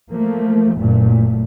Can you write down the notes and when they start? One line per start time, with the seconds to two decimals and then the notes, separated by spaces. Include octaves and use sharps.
0.11 F3 A3 A#3
0.78 F#1 A#2 A3